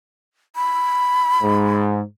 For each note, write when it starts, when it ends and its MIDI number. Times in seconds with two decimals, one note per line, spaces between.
0.56 1.80 83
1.42 2.00 44